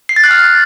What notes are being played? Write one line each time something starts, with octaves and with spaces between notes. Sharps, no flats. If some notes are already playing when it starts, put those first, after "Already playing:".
C7
A6
F#6
F6